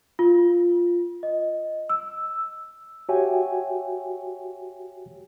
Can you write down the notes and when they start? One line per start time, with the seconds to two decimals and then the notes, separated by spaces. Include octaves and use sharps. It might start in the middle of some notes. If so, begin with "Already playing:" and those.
0.19 F4
1.23 D#5
1.89 E6
3.09 F#4 G4 C#5 E5 G5 G#5